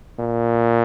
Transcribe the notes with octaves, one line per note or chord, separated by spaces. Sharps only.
A#2